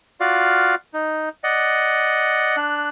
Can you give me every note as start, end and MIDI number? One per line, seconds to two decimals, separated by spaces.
0.20 0.75 65
0.20 0.75 66
0.20 0.75 74
0.20 0.75 77
0.94 1.29 63
1.44 2.56 74
1.44 2.56 75
1.44 2.56 78
2.57 2.90 62
2.57 2.90 90